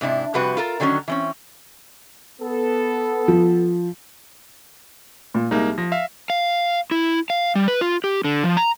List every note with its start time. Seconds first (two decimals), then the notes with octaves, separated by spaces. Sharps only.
0.01 G#2 C3 D4 E4
0.34 F2 C3 G3 F#4 B4
0.57 F4 A4 A#4
0.80 D3 D#3 F#3 G#3 C#4
1.08 E3 C4 C#4
2.41 B3 A4
3.28 F3
5.34 A#2
5.51 C2 G#3 A#3 D#4
5.78 F3 A#6
5.92 E5 F5
6.30 F5
6.91 E4
7.30 F5
7.55 G3
7.68 B4
7.81 F4
8.04 G4
8.24 D3
8.44 F3
8.57 A#5